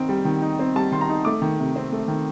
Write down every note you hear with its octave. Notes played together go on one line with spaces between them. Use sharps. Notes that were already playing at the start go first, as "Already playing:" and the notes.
Already playing: D#3 C4 D#4 G5
G3
D#3
D#4
C4
G3 A5
D#3 C6
A#5
D#4
A3 D6
D#3
C3
C4
A3
D#3